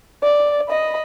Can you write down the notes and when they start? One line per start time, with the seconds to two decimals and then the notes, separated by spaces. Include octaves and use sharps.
0.23 D5
0.69 D#5 B5